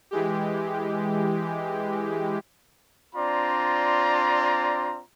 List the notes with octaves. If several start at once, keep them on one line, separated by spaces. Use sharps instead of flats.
E3 G#3 G4
C4 D4 F4 D5 A#5